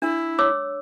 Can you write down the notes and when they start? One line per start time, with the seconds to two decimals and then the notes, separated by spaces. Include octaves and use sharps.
0.02 D4 E4
0.39 C#5 D6 E6